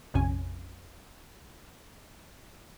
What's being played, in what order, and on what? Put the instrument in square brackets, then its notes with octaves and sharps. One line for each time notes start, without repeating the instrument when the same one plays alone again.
[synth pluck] A#1 F2 C3 C#4 G#5